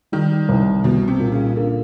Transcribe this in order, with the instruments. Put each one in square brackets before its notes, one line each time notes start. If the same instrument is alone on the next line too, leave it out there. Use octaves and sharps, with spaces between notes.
[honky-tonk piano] D#3 [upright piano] G3
[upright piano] C2
[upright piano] C2 [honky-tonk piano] B2
[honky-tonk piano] C3
[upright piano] A#2
[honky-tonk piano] C#3
[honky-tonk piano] D3 [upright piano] A#3